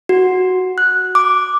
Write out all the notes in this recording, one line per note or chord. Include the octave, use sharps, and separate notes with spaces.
F#4
F#6
D6